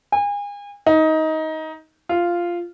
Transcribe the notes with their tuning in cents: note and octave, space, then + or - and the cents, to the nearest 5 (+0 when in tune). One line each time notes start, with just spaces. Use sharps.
G#5 -35
D#4 +20
F4 -5